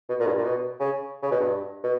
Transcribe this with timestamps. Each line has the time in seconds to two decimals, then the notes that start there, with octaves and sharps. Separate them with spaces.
0.09 B2
0.19 A#2
0.27 G2
0.36 A#2
0.44 B2
0.80 C#3
1.22 C#3
1.32 B2
1.40 G2
1.84 B2